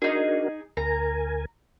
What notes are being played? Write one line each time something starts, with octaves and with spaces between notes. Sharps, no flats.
D4 D#4 F#4 G#4 A#4
D2 A#4 G#5 A#5